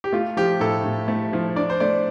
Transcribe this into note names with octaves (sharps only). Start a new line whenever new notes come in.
G4
A3 F4
F3 G4
A2 A4
A2
A3
F3
D4 D5
C5
A3 D5